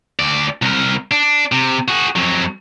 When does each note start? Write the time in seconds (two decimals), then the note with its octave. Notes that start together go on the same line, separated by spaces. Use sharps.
0.19 D2 D5
0.62 C2 A#4
1.11 D4
1.52 C3
1.88 F#4 G#4
2.16 F2 F#3